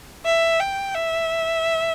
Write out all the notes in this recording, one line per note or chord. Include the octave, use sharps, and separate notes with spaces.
E5
G5
E5